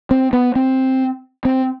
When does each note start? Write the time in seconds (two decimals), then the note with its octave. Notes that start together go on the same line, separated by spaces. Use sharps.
0.11 C4
0.33 B3
0.56 C4
1.45 C4